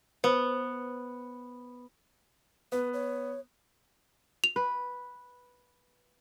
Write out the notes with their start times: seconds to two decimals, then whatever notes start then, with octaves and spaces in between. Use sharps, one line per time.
0.24 B3 B4 C5
2.72 B3 B4
2.93 C#5
4.44 F7
4.56 B4